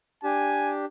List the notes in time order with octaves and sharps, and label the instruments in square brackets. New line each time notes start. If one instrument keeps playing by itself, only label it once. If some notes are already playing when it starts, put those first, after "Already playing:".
[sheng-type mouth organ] D4 G4 [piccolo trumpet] G#5